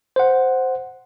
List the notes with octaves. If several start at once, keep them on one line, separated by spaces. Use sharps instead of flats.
C5 F#5